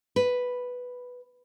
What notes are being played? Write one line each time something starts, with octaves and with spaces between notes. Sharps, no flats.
B4